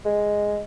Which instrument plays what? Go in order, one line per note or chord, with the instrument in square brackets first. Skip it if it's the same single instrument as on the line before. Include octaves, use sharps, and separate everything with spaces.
[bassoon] G#3